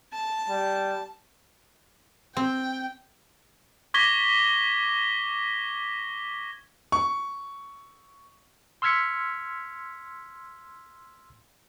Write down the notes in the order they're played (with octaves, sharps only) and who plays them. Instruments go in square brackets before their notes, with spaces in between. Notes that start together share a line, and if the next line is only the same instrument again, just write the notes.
[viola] A5
[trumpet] G3
[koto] C4 [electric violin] G5
[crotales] C#6 D6 G#6 A#6 B6 G7
[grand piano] C#6
[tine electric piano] C6 E6 F6 G#6 B6 C#7